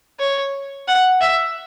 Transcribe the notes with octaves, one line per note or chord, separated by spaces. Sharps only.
C#5
F#5
E5